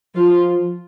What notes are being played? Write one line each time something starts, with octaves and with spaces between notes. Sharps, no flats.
F3 F4